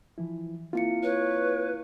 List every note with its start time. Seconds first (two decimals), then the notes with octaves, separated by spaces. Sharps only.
0.18 E3 F3 E4
0.73 A#3 C4 E4 F4 F5 C#7
1.03 B4 C#5